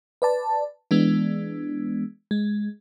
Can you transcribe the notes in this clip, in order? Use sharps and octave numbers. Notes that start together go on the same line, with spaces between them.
B4 D5 A5
E3 G#3 B3 D4
G#3